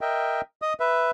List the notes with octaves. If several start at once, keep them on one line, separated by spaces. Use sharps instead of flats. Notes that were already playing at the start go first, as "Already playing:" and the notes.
A#4 D#5 E5 G5
D#5 D#6
B4 E5